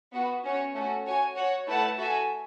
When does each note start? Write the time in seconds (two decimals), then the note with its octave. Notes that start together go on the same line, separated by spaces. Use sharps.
0.13 B3 F#4 B4
0.44 C#4 F#4 C#5
0.74 A3 C#4 F#4
1.05 F#4 C#5 G#5
1.36 F#4 C#5 F#5
1.66 A3 E4 B4 F#5 A5
1.98 F#4 A4 E5 G#5